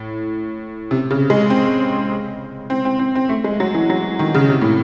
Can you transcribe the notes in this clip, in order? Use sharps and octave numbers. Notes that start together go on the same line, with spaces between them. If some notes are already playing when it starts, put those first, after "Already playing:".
Already playing: A2
C3
C#3
G#3
C4
C4
C4
C4
C4
A3
G#3
F#3
E3
F#3
D#3
C#3
C3
A2